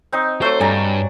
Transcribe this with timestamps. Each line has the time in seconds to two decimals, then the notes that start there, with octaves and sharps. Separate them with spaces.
0.12 C4 D#4
0.42 F#3 A3 C5
0.61 G2 D5 G#5 A#5